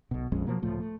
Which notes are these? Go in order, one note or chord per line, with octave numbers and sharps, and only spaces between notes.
B1 B2
A#1 F2 G#3 C#4
B2 F3 F#3 A#3
C#2 A2 F3 A3
A3